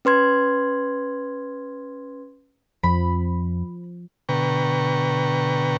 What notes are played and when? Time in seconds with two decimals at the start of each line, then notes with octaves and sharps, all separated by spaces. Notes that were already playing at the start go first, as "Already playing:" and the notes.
0.05 C#4 B4 C6 G#6
2.83 F2 F3 B5
4.29 B2 D3 B4 G5 A#5 C#6